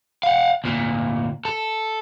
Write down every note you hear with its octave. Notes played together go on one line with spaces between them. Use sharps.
F5 F#5
D2 A#2
A4